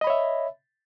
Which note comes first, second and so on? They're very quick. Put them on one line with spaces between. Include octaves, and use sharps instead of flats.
D#5 B5 C#5 E5